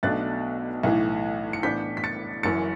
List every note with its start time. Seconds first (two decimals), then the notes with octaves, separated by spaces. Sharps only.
0.03 B1 B2 A3 D4 F#6 A6
0.83 B1 A2 E3
1.53 C#7
1.63 A2 E3 B3 D4 G6 B6
1.97 B6
2.04 A6 C#7
2.43 F#1 F#2 E3 A6 C#7